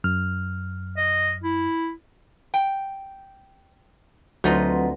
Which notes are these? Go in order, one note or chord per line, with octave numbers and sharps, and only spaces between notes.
F#2 F6
D#5
E4
G5
D2 F#3 C4 D#4 F4 B4 D#5 F#5